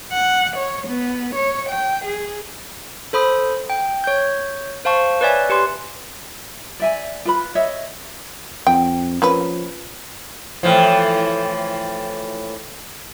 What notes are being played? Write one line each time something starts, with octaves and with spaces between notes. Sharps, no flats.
F#5
C#5
B3
C#5
G5
G#4
A4 C5 B5 D#6
G5
C#5 G6
C5 F5 A5 C#6
B4 C#5 D5 E5 G#5
G4 B4 C6
D5 E5 G#5
F4 B4 B5
C#5 D#5 E5
F2 G5
F3 A#3 C#4 B4
A2 E3 F3